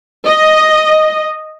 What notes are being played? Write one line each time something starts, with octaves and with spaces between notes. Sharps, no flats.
D#5